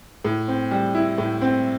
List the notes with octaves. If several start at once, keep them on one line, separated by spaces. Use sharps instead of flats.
A2
C4
G3
E4
A2
C4